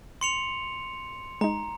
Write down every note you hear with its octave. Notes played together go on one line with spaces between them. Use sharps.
C6 C#7 F7
G#3 D#4 A#5